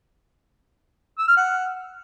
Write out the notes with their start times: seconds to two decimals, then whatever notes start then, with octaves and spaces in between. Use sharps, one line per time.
1.18 E6
1.27 F6
1.37 F#5